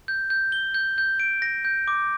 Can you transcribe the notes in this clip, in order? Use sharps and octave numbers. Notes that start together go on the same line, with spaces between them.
G6
G6
G7
G6
G6
D7
A#6
G6
D6